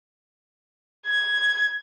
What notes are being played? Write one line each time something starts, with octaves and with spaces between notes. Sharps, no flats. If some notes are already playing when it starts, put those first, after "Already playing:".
G#6